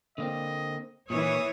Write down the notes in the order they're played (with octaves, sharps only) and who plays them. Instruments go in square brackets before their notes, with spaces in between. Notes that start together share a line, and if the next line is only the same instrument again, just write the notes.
[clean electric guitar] D3 A#3 C4 [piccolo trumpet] D#5
[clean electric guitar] A#2 D#3 [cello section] E3 C#5 [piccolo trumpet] D#6